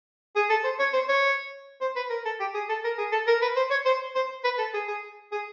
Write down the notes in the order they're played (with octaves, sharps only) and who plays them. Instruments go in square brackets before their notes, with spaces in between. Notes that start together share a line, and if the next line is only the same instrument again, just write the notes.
[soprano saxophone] G#4
A4
C5
C#5
C5
C#5
C5
B4
A#4
A4
G4
G#4
A4
A#4
G#4
A4
A#4
B4
C5
C#5
C5
C5
B4
A4
G#4
G#4
G#4